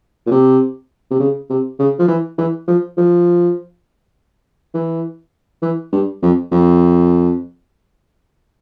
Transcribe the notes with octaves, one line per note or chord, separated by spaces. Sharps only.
A#2
C3
C3
C#3
C3
C#3
F3
E3
E3
F3
F3
E3
E3
G2
F2
F2